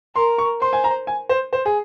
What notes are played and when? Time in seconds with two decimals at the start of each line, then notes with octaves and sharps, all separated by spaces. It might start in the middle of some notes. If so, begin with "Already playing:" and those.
0.15 A#4 C6
0.38 C#6
0.61 C5 C6
0.73 G#5
0.84 A#5
1.07 G#5
1.29 C5
1.53 C5
1.66 G#4